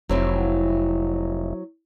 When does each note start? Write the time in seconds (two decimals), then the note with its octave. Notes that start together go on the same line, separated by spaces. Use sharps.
0.09 F1 F#3 C4 E4